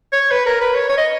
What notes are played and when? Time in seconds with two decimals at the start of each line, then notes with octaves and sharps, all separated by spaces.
0.13 C#5
0.31 B4
0.46 A#4
0.61 B4
0.75 C#5
0.89 C#5
0.98 D#5